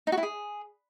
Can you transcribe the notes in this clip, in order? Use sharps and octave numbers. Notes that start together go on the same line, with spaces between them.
D#4
F#4
E4
G#4